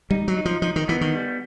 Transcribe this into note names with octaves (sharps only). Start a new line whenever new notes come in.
G3 D#4
F#3
D#4
F3
F3 D#4
D#3
E3 B3
D#3
G3